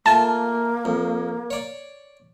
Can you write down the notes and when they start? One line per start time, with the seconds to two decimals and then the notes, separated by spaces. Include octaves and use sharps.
0.06 A3 A#3 F4 G#5 A5
0.85 F2
1.50 C#5 D5